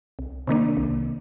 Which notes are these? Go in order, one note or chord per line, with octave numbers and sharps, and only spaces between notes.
C2
C3 D#3 A#3 D4
C2